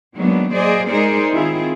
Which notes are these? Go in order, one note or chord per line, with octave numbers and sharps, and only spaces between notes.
D#3 F#3 G#3 A#3 B3 D4
F#3 A#3 G#4 C5 D5 D#5
G#3 D#4 G#4 A#4 C5 D5
D#3 C4 E4 F4 G#4